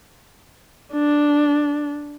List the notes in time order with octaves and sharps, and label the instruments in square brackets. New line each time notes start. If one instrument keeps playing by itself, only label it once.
[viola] D4